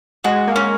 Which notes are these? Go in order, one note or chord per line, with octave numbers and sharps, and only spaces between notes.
G#3 F#4
A#3
C#4